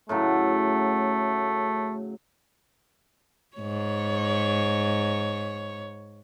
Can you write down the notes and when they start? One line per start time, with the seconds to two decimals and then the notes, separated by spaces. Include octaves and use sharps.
0.09 A2 C#3 F#3 A3
3.57 G#2 C#5